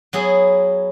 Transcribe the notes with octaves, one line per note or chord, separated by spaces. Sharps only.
F#3 B3 E4 G#4